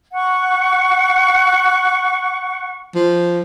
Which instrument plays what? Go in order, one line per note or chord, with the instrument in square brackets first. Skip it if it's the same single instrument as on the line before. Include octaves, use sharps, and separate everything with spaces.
[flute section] F#5 C#6
[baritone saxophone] F3